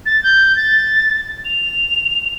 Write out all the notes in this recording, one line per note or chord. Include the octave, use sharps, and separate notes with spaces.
A6
G6
A6
F7